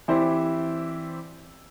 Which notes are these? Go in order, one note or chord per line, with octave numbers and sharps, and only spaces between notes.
E3 C4 E4 G4 C5 D5